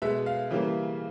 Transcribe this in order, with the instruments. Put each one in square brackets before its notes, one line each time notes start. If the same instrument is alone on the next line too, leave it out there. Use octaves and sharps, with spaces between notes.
[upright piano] B2 G#3 B3 E5
F5
C#3 E3 G3 A#3